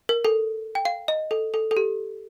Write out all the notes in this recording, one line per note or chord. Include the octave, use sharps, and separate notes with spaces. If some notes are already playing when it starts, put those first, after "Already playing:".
A#4
A4
G5
F5
D#5
A4
A4
A4
G4